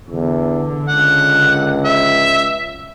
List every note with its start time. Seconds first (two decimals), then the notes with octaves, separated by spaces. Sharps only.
0.10 E2 D3
0.88 C#2 F#5
1.85 E5